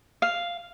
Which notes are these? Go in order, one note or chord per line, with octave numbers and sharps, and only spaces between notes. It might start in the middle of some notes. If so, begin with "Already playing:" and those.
F5